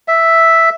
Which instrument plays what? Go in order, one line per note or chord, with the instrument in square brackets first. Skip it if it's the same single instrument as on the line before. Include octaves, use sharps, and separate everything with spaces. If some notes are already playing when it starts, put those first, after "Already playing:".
[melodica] E5